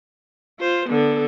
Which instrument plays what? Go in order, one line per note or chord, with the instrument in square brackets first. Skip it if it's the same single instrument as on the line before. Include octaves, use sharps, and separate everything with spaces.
[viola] F4 [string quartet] C5
[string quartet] D3 [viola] B3 A4